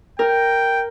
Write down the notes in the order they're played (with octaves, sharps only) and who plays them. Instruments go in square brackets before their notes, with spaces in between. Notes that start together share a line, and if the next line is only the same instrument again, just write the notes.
[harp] A#4 [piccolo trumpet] G5